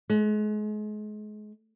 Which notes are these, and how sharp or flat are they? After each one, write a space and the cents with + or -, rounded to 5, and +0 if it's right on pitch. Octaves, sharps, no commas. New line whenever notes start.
G#3 +35